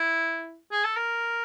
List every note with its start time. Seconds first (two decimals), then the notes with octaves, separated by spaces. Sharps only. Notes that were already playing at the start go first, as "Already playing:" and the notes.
Already playing: E4
0.72 G#4
0.84 A4
0.96 A#4